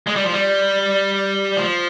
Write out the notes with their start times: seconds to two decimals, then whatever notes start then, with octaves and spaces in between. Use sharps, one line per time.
0.07 G#3
0.16 G3
0.24 F3
0.32 G3
1.57 F3